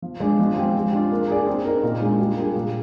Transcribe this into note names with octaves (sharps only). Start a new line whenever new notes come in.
F3
G#3 D4
F3
G#3 C4 G4
G#3
D4 F4
A#3
D4 G#4 D5
C4
D#4 A#4
A#2
G#3 D4 F4
G3
A#3 D4 F4 G#4
A#2